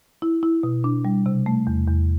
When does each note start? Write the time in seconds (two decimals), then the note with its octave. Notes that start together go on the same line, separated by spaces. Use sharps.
0.22 E4
0.43 E4
0.63 B2
0.84 D4
1.05 G3
1.26 C3
1.46 A3
1.67 E2
1.88 E2